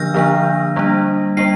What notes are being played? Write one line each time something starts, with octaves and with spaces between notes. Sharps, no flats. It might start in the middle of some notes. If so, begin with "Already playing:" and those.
Already playing: D3 F3 A#3 D4 E6 F6 G6 A#6
D3 F3 A#3 D4
G3 A#3 D4
G3 A#3 D4 C7